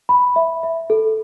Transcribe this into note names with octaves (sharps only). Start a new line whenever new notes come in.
B5
E5
E5
A4